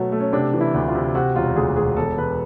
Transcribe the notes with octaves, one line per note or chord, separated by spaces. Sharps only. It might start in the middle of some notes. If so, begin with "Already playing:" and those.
Already playing: B2 F#3 A3
A3
C#4
C3 D4
E3
E4
D2
F4
C3
C3 F#4
E1 F4
D2 G#4
E1 G#4
E1 A4
E1 B4